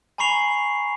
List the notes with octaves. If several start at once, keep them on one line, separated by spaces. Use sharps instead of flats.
G#5 A#5 B5 C#6 C7 F7